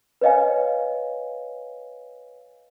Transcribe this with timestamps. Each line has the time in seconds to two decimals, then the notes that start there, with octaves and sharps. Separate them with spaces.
0.21 B4 C#5 D#5 F5 G#5